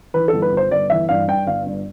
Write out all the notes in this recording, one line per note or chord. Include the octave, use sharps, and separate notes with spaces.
E3 B4
A4
G1
B4
G1
C5
G1 D5
E3 E5
G2 F5
G2 G5
G1 F5
G2